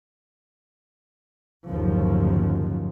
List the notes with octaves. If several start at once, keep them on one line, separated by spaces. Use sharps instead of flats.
G1 D#2 A2 C#3 F3 F#3